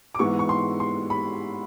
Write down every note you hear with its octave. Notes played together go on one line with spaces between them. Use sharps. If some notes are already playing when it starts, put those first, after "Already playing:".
D6
G#2 E3 G#3 B3 C#6
C#6
C6
C6
B5